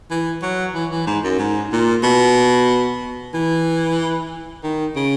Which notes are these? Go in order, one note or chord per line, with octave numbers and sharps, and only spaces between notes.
E3
F#3
E3
E3
G#2
F#2
G#2
A#2
B2
E3
D#3
C#3